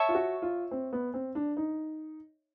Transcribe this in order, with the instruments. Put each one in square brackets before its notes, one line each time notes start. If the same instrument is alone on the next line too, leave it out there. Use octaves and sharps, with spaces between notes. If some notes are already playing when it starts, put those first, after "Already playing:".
Already playing: [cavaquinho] C#5 E5 A5 C#6
[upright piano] F4
F#4
F4
C4
B3
C4
D4
D#4